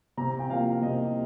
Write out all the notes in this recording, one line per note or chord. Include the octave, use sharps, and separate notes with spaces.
C3 A#5
G5
F3 A#3 F5
C3 D#5